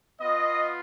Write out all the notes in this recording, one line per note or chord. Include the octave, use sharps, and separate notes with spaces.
B3 F4 D#5